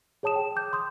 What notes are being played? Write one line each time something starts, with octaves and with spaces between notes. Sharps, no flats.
G#4 C#5 A5 D#6 E7
G5
D6 G6
C6 D#6 G6